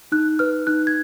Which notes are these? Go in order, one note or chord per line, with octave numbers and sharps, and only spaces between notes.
D#4 F#6
B4 F6
D#4 F#6
G#6